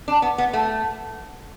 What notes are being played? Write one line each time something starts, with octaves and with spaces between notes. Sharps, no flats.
D4
B3
B3
A3